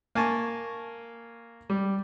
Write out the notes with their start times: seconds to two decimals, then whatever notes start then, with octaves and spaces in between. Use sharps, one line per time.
0.15 A#3 G#5 A5 C#6
1.70 G3